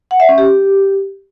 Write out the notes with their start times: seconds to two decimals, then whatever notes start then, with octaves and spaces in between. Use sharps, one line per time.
0.11 F#5
0.20 E5
0.29 C#4
0.38 G4